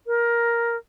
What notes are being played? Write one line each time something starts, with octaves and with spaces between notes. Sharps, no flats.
A#4